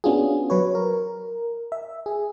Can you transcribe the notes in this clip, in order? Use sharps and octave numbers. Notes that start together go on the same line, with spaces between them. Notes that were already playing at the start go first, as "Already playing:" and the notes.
B3 C#4 D4 F4 F#4 G#4
F#3 B4 C#5
A#4
E5
G#4